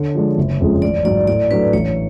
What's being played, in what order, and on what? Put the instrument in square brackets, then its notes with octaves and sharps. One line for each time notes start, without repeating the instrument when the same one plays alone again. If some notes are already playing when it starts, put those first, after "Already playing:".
Already playing: [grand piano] D3 [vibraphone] C#5
[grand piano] F3 G#3 D4
F#1
F2 C#3 F3 G#3
[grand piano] A1 [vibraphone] D5
[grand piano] G#2 F#3 [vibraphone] D5
[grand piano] A2 [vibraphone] D5
[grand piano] F#3 A3 D4 [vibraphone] B4
[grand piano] A1 [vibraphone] C#5